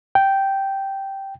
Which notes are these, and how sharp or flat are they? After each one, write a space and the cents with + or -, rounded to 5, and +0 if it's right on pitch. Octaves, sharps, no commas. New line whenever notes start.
G5 -5